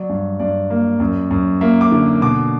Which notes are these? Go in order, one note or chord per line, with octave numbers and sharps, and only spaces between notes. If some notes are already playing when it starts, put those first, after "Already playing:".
Already playing: F#3 D5
G2
G2 D5
A#3
F#2
F#2
A#3 E5
D6
D3
B2 D6